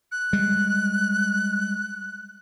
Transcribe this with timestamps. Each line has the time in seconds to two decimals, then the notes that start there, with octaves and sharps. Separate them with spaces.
0.12 F#6
0.33 G3 G#3